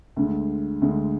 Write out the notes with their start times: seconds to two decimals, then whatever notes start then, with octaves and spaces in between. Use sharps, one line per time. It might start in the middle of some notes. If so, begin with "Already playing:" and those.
0.16 D2 D3 G#3
0.82 D2 D3 G#3